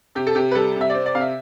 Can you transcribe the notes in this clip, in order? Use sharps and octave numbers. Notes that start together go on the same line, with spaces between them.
C3 G4
A4
C3 G4
B4
G3 A4
C3
E5
C4 D5
D5
C3 F5
E5